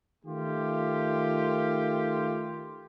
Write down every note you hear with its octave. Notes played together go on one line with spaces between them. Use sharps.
D#3 A3 F4 G4